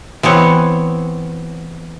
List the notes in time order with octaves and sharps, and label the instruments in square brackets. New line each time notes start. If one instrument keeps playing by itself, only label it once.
[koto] E3 B3 C4 C#5